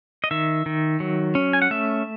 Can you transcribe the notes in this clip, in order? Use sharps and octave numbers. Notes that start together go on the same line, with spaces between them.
D#5
D#3 E5
D#3
F#3
C#4
G#5
F#5
A3 E5